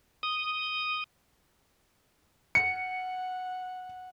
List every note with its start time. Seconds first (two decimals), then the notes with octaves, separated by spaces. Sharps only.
0.23 D#6
2.55 F#5 C#7